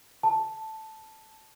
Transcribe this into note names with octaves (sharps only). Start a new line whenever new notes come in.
A5